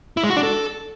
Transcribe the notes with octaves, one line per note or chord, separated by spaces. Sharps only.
E4
G#3
F#4
D4
A4